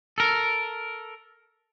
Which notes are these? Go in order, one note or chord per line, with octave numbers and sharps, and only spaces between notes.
A4 A#4